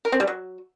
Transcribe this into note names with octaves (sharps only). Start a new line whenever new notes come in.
A#4
C4
G3
F#3